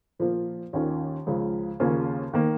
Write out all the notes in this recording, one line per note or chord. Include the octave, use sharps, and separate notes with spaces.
A#2 F3 A#3 F4
D#2 D#3 C#4 F4
C#2 C#3 F3
D#2 C#3 A#3 C#4 F4
D#3 A#3